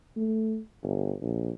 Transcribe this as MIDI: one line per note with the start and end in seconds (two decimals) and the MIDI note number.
0.17 0.59 57
0.83 1.13 31
1.21 1.51 34